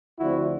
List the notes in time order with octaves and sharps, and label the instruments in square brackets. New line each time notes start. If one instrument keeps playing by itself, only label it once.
[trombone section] D2 D3 F3 A3 C4 E4 F#4